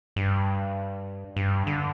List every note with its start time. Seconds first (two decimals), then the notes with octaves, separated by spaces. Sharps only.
0.16 G2
1.36 G2
1.67 D3